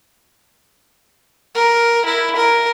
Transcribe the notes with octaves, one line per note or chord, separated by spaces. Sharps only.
A#4
E4
A#4